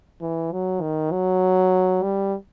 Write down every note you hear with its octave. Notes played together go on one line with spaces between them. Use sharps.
E3
F#3
D#3
F#3
G3